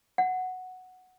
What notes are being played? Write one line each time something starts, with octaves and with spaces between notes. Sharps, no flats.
F#5